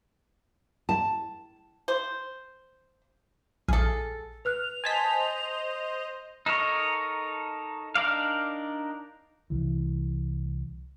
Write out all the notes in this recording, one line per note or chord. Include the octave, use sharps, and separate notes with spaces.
A5
C5
A#1 G#4 A4 F6
B4 F6 F#6 F7
C5 D#5 G#5 A5 B6
D#4 A4 A#4 C#5 D#5
D4 D#4 A#4 D5 F5
C2 E3